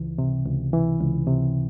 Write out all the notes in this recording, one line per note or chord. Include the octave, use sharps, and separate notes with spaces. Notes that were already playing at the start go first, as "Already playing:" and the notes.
Already playing: C#2 E3
C3
C#2
E3
C#2
C3